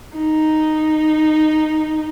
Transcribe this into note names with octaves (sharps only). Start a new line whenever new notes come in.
D#4